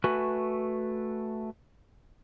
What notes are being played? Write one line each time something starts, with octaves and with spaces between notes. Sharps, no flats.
A3 F#4 B4 G#5